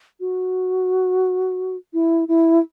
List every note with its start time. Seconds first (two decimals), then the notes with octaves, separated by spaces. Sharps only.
0.20 F#4
1.93 E4
2.28 E4